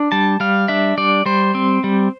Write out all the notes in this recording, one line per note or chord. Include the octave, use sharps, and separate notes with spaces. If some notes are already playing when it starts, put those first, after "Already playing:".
Already playing: D4
G3 A5
G3 F5
D4 E5
G3 D5
G3 C5
C4
G3